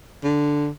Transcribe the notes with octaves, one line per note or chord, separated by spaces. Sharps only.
D3